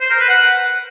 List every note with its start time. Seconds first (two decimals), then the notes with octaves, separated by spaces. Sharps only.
0.01 C5
0.10 A#4
0.19 B4
0.29 F#5